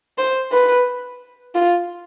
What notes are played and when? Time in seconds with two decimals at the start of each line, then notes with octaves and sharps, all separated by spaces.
0.18 C5
0.52 B4
1.55 F4